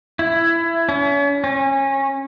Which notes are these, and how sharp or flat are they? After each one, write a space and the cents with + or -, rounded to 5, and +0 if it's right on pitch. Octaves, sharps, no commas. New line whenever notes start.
E4 +15
C#4 +35
C#4 -25